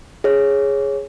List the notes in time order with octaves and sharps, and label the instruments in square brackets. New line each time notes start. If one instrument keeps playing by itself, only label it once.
[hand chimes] G#4 C#5